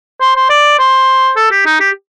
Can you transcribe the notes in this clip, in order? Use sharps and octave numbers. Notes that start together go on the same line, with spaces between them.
C5
C5
D5
C5
A4
G4
D#4
G4